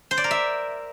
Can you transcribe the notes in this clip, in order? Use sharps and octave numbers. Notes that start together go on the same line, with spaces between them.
C5
D5
A#4
E5